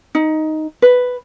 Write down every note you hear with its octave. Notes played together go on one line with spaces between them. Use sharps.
D#4
B4